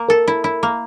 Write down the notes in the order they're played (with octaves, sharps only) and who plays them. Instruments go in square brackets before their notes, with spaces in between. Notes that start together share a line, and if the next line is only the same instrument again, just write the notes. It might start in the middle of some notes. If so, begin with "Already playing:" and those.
Already playing: [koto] A#3
[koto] A4 [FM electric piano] A#4
[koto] E4
E4
A#3